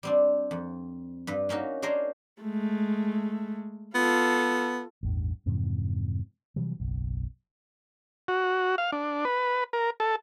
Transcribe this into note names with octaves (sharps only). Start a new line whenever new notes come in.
G3 C4 D4
F2
G2 B4
A#3 C#4 D#4 F#4
D4 G#4 A#4 C5 C#5 D#5
G#3 A3
B3 F4 A4
A1 E2 G2
F2 G#2 C3 E3
C3 E3 F#3 G3
F#1 B1
F#4
F5
D4
B4
A#4
A4